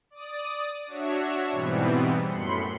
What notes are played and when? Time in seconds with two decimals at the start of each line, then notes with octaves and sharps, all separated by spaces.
0.11 D5 D#6
0.87 D4 F#4 C#5 E5
1.51 G#2 B2 E3 G3 B3 C4
2.27 F#2 A2 B5 C6 C#7